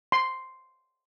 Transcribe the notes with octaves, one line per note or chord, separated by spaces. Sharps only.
C6